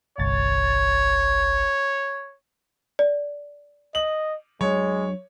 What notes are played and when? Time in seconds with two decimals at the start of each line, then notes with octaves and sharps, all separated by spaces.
0.18 G1 C2 C#5 A6
2.99 D5
3.95 D#5 F#7
4.61 F#3 G#3 D4 C#5